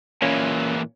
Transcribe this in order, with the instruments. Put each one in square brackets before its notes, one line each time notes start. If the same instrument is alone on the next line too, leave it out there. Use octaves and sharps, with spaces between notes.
[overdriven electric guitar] A#2 E3 [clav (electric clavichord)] A#3 C#4